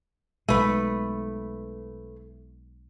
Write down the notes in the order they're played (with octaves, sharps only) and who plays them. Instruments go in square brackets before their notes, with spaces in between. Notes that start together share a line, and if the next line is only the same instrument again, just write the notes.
[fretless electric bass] B1 G#3 [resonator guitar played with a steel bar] A3 B4